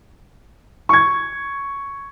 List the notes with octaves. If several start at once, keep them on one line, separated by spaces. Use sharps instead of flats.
C#6 G#6